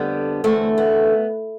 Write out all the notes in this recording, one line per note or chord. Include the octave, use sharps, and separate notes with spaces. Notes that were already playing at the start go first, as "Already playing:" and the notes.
Already playing: F2 D3 G3 B3
E2 D3 A3 C4
B3